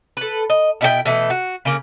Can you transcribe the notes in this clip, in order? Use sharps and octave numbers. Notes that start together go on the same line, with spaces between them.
A4 B4
D#5
B2 E4 F#4 G5
B2 E3 A3
F#4
C#3 A#3